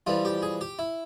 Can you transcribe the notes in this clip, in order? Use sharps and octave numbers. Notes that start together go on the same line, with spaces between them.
F2 E3 G3 F4
G4
G#4
G4
E4